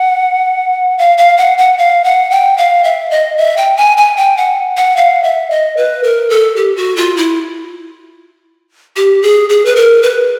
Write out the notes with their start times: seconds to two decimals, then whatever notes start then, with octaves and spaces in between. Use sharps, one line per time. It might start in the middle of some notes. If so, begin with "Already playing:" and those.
Already playing: F#5
0.98 F5
1.18 F5
1.38 F#5
1.58 F#5
1.78 F5
2.04 F#5
2.31 G5
2.57 F5
2.84 E5
3.11 D#5
3.38 E5
3.57 G5
3.77 G#5
3.97 G#5
4.17 G5
4.37 F#5
4.77 F#5
4.97 F5
5.23 E5
5.50 D#5
5.77 B4
6.03 A#4
6.30 A4
6.56 G4
6.76 F#4
6.97 F4
7.17 E4
8.96 G4
9.22 G#4
9.49 G#4
9.65 B4
9.76 A#4
10.03 B4